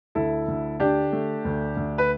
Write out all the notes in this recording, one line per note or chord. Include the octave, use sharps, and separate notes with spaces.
D2 E4 A4
D2
D3 D4 G4
A3
D2
D2
B4